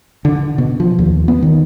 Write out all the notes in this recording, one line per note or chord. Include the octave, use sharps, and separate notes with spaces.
D3
B2
F3
D#2
B3
D#3